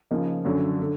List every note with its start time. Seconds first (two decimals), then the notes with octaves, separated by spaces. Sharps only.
0.11 C#3 F3 A#3 D#4
0.45 F#2 D3 F#3
0.82 D3